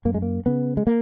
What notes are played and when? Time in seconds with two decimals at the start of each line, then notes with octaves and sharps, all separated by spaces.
0.05 F#2 A#3
0.14 G#3
0.22 A#3
0.46 C#3 B3
0.77 G#3
0.87 A#3